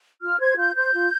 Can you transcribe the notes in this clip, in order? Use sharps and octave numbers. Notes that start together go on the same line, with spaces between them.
F4 F6
C5 G#6
F4 G6
C5 G6
F4